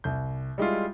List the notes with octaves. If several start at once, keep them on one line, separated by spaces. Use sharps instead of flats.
C2 G6
G3 G#3 E4 F4